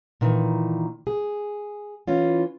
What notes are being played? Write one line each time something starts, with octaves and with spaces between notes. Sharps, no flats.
A#2 D#3 E3
G#4
E3 C#4 F4